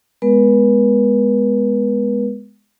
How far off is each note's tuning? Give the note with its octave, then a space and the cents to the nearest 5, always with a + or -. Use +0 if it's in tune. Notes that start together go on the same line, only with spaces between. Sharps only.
G#3 +0 B3 +0 B4 -45